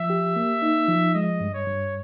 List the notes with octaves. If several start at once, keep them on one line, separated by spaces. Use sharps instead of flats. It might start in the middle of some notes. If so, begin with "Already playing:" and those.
Already playing: F3 E5
G4
A#3
D#4
F3
G#3 D#5
G2
C#5
G2